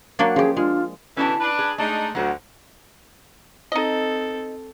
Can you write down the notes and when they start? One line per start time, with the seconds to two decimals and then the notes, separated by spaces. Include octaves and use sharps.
0.19 F#3 A#3 D4 F#5
0.36 F3 C#4 G4 G#4
0.57 G#3 D4 F4
1.17 B2 D3 E3 C#4 E4 A5
1.40 D4 B4
1.59 G#4
1.78 G#3 A3 D4 D#4
2.15 D2 F#3 F#4
3.72 C4 D#4 A4 D#5